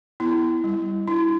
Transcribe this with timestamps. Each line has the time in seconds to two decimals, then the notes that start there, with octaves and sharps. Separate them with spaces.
0.20 B3 E4
0.64 G3
1.08 D4 E4